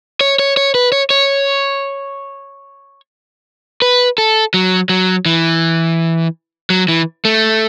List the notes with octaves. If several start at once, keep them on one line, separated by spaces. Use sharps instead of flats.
C#5
C#5
C#5
B4
C#5
C#5
B4
A4
F#3
F#3
E3
F#3
E3
A3